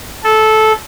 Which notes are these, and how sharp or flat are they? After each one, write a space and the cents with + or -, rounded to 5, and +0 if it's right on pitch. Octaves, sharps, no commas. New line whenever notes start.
A4 -15